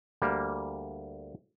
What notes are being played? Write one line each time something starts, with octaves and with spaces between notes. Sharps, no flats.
D2 G3 A#3